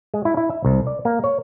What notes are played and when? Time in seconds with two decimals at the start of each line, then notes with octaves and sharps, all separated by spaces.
0.14 G#3
0.25 E4
0.37 E4
0.50 E5
0.65 C2
0.87 D5
1.05 A#3
1.24 C#5